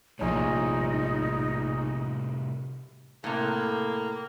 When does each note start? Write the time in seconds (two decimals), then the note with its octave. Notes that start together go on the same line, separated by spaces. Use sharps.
0.19 A#1 A2 C3 G3 D#4 C#5
3.24 A2 C3 A#3